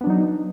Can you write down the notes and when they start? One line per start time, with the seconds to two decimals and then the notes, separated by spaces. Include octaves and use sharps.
0.01 B3
0.04 D4
0.07 F#3
0.10 D#4